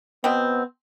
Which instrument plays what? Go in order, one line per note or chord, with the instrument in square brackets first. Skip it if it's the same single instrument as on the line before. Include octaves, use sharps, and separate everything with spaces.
[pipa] B2 C4 [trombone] B3